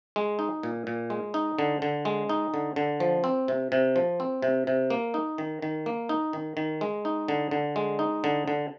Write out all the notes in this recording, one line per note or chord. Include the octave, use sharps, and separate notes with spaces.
G#3
D#4
A#2
A#2
G#3
D#4
D3
D3
G#3
D#4
D3
D3
F3
C4
C3
C3
F3
C4
C3
C3
A#3
D#4
D#3
D#3
A#3
D#4
D#3
D#3
G#3
D#4
D3
D3
G#3
D#4
D3
D3